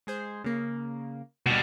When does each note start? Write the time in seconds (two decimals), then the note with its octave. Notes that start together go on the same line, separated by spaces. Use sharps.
0.07 G#3 G#4 C5
0.44 C#3 A#3
1.46 B2 G3